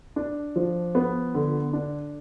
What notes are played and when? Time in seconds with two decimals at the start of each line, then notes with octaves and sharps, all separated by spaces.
0.16 D4
0.56 F3
0.95 B3
1.34 D3
1.73 D4